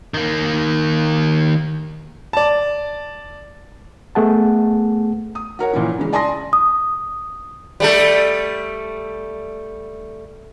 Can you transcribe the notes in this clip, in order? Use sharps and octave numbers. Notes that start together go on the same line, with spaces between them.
D#3 A#3
D5 A5
A3 B3 G#4 F#5 A5
D#6
F#4 A#4 C#5 F#5
A#2 E3 F3 C#4 E4
C#3 E3 G#3
D5 G#5 A5 C6 D#6 A#6
D#6
G3 A3 A4